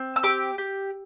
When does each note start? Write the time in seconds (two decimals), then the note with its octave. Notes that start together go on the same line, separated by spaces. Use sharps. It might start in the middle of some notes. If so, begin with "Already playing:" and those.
Already playing: C4
0.16 E6
0.23 G4 D6
0.58 G4